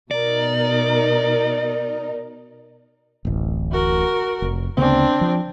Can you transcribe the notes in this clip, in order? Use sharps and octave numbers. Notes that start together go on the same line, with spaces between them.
B2 D#4 A#4 D5
D1 A1
F#4 A#4
F1
D2 C#3 B3 C4 D4
F3